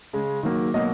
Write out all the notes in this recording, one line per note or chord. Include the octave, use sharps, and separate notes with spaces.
C#3 G#3
D#3 F#3 A#3
B2 F#3 A#3 D#5